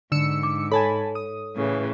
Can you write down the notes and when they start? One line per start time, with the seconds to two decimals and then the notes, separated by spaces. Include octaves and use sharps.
0.12 G#2 D3 E6 C#7
0.43 D6
0.72 A4 C#5 G#5 A5 B5
1.15 D#6
1.56 A2 C#3 E3